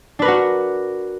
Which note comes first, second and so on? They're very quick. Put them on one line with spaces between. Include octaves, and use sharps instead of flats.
D4 B4 A#4 F#4